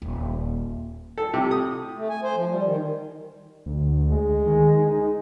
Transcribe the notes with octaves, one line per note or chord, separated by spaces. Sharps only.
D#1
A4
C3
D#6
A3
G#5
C5
F3
G3
D#3
D2
G#3
D#3
D#4